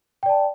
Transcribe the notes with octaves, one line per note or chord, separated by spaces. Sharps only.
D5 G5 A5